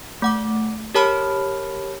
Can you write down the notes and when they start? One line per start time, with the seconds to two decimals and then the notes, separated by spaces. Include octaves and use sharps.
0.22 A3 F#5 D6
0.95 G4 A#4 C#5 A5 B5 F6